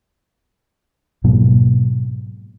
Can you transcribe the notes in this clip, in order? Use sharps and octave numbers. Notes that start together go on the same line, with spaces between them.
G#2 B2 F#3 A#3